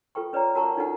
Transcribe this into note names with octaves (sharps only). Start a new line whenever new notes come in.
F4 A4 B4 G5 C#6
C#4 B4 C#5 D5 G5 A#5
F#4 A#4 F#5 A5 A#5 C#6
D4 D#4 F4 A4 B4 F#5